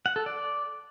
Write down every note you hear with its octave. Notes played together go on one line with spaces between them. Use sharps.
F#5
A4
D5